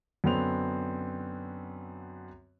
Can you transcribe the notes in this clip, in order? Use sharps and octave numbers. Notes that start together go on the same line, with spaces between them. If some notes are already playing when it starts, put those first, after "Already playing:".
F#2 D3 B3 C4 F7